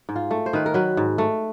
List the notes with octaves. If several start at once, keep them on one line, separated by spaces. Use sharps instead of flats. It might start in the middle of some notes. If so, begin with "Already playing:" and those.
G#2
F4
A3
C5
D#3 B4
A#4
F#3 B4
G#2
A3